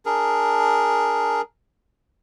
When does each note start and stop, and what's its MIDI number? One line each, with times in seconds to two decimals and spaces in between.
0.06 1.41 62
0.06 1.41 68
0.06 1.41 70